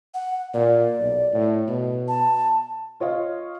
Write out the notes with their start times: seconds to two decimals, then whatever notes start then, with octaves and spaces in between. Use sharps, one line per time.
0.14 F#5
0.54 A#2 D5
0.99 B1
1.34 A2
1.68 B2
2.08 A5
3.00 F4 C#5 D#5 F5